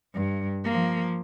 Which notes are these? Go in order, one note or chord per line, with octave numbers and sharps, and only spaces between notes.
G2
F3 A#3